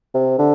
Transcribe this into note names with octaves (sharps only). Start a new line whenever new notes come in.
C3
D3